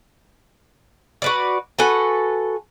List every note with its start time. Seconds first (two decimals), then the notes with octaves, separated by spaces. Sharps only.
1.22 F#4 B4 D5
1.79 F#4 A4 B4 G#5